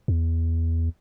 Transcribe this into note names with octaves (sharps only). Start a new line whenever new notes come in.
E2